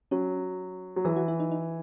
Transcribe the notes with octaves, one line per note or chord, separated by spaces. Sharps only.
F#3 C#4
F#3
E3 G#4
F#4
E4
D#4
D#4